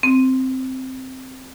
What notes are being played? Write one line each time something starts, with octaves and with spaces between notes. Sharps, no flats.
C4